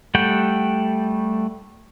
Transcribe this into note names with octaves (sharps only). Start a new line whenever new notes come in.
G3 A3 F#5 G5